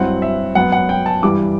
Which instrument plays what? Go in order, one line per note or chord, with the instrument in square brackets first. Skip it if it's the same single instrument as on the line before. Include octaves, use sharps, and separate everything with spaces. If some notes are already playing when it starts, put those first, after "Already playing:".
Already playing: [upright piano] G2 F#3 C4 E4 F#5
E5
F#2 F#3 B3 F#5
F#5
G5
A5
G2 E3 G3 D6